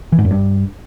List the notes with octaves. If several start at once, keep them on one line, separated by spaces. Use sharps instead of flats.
E3
G#2
F#2
G2